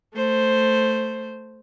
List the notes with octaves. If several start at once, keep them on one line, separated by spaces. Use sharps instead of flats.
A3 C5